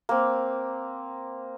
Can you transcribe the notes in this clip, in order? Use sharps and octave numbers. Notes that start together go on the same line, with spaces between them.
A#3 C4